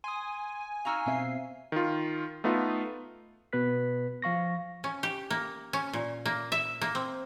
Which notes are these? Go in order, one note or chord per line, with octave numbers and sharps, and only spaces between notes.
G#5 C6 D#6
D#4 F#4 F5 A#5 E6 F6
B2 C4 E5 F5 C7
D#3 F4
A3 B3 D#4 F4
B2 B3 B4 F#6 B6
F3 F5 C#6 A#6
C#4
G4
A#3
C#4
A#2
A#3
E5
A#3
C4